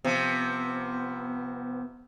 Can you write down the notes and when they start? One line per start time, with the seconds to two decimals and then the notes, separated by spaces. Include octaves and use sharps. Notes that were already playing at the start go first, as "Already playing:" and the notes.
0.05 C3 F3 B3